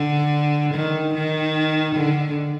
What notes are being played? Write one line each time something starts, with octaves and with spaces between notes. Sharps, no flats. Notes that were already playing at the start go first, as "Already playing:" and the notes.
Already playing: D3
D#3
D#3
D3